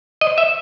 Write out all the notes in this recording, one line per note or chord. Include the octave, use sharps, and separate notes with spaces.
D#5
E5